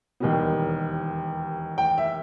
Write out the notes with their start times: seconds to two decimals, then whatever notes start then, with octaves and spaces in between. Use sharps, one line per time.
0.20 E1 D#2 D#3 G3 B3
1.78 G5
1.98 E5